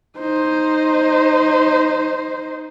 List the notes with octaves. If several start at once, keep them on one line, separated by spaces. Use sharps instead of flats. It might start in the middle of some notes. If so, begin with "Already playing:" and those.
D#4 C5